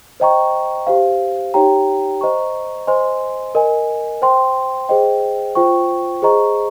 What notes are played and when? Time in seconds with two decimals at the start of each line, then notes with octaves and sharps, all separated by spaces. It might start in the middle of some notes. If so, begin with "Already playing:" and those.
0.20 C5 D#5 G5 A#5 C#6
0.87 G4 C5 F5
1.54 D#4 G4 C#5 G5 A#5
2.21 C5 D#5 A#5 C#6
2.87 C5 D#5 G#5 C6
3.55 A#4 D#5 G#5
4.22 C5 G5 C6
4.89 G#4 C5 D#5 G5
5.55 F4 C5 G5 C#6
6.22 G#4 C5 D#5 A#5 C#6